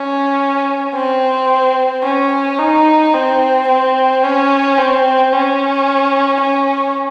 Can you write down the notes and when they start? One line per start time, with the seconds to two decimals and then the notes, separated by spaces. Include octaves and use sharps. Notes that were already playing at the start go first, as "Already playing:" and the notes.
Already playing: C#4
0.94 C4
2.03 C#4
2.59 D#4
3.14 C4
3.68 C4
4.23 C#4
4.78 C4
5.32 C#4
6.41 C#4